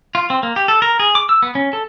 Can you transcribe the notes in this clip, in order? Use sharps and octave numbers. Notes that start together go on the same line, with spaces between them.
F4
C4
A#3
G4
A4
A#4
G#4
D6
E6
B3
C#4
A4